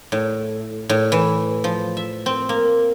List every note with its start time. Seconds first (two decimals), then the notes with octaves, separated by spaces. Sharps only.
0.12 A2
0.89 A2
1.12 E3
1.64 F3
1.97 E5
2.26 C4
2.49 A#3